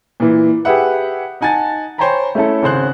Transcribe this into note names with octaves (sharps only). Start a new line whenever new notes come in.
A#2 E3
G4 G#4 B4 E5 F#5
D#4 F#5 G#5 A5 A6
C5 C#5 G5 G#5 A#5 B5
A3 C#4 E4 A4
G#1 C#3 C5 F#6